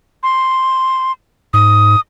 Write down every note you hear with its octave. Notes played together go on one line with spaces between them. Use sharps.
C6
G#2 D#6